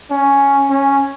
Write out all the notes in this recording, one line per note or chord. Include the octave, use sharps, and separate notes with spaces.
C#4
C#4